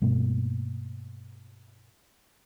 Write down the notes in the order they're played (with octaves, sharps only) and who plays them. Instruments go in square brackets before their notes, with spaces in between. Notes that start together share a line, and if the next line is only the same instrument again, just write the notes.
[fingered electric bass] G2 B2 A3 A#3